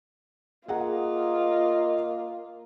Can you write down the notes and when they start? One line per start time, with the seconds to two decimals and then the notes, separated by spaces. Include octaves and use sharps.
0.68 A#3 F4 G#4 D#5 F#5 A#5